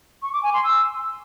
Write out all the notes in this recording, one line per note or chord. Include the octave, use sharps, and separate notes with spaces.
C#6
D6
G#5
C6
E6